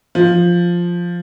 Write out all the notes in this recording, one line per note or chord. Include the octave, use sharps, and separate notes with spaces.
F3